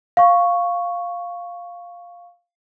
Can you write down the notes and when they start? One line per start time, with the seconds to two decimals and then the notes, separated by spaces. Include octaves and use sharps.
0.17 F5 C#6